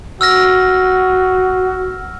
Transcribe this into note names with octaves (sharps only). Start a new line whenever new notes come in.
F#4 E6 F6 A#6